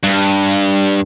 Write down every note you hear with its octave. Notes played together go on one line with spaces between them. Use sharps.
G2